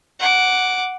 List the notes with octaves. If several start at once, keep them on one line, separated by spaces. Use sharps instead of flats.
F#5 D6